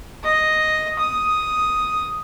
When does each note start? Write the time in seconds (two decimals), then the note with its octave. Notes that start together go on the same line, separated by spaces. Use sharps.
0.23 D#5
0.98 D#6